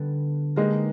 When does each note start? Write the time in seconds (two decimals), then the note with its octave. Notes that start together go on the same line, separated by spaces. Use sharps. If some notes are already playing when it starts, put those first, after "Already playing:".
Already playing: D3 G3 B3 D4
0.56 G#3 A#3 D#4 G4 B4